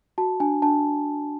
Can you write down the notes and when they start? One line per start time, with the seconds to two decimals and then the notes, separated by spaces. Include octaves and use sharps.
0.18 F#4 A5
0.40 D4 G#5
0.62 D4 A5